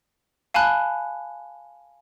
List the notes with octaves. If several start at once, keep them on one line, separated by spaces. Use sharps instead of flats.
F5 G#5 A5 B5 F#6